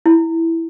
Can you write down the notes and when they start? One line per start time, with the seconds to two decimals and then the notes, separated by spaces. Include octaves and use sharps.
0.06 E4